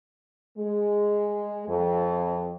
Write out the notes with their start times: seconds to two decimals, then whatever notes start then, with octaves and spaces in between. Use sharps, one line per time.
0.57 G#3
1.69 F2